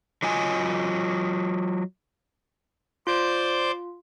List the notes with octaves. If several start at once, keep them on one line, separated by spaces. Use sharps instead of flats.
F#3 F4 D#5 G#5
F4 C5 D5 G6